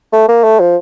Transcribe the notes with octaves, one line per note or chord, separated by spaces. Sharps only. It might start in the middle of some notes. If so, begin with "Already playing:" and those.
A3
A#3
A3
F3